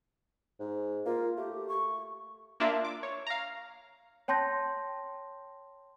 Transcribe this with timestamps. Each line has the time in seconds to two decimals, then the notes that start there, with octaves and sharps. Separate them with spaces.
0.60 G#2
1.06 A#3 F4
1.37 A3 G4
1.68 C#6
2.60 A#3 D4 F4 E5
2.84 D6
3.03 C#5
3.27 F5 A#5
4.28 C#5 G5 A5 C6 G6 A#6